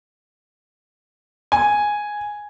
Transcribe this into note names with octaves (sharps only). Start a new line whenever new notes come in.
G#5